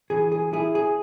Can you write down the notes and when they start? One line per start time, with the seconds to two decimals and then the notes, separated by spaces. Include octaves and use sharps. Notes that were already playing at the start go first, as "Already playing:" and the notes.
0.10 E3 G#4
0.32 G#4
0.53 E4 G#4
0.75 G#4